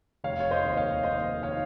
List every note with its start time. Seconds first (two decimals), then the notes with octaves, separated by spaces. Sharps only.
0.24 F1 C#5 F5
0.40 C#5
0.51 C5 D#5
0.63 D#2
0.72 D#5
0.77 C#5 F5
1.03 D#2 C5 D#5
1.43 D#3 C#5 F5